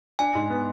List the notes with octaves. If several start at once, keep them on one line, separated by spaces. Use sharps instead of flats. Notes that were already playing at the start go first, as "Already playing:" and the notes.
D4 G#5
G#2
B3